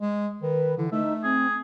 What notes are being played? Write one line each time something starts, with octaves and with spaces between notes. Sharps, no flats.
G#3
D#3 B4
D3 E3
A3 D#4 E5
C4 G#4